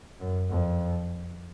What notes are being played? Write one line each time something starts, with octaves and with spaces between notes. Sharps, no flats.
F#2
F2